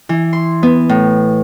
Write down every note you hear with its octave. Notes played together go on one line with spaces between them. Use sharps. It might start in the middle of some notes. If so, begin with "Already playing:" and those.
E3
C6
B3
A2